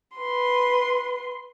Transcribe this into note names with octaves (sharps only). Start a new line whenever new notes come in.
B4 C6